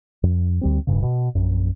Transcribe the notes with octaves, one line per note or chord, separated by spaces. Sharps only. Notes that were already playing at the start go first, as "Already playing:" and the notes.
F2
D2 G3 C4
D1 A#1 G2 C#3
B2
A#1 F#2